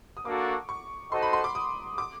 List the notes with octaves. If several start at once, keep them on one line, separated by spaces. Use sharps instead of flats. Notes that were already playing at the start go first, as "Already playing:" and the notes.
D#6
A#3 D4 F#4 A4 D6
C#6
C#6
D#4 F#4 A4 C5 D#5 C6
B5
C6
D6
D#6
D6